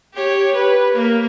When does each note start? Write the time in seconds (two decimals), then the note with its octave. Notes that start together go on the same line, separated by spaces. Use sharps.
0.14 G4 C#5
0.55 B4
0.94 A#3 A#4